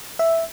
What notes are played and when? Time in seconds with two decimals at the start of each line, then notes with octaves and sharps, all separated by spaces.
0.19 E5